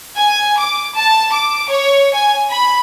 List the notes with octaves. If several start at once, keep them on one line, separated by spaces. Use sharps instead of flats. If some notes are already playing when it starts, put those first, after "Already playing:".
G#5
D6
A5
D6
C#5
G#5
B5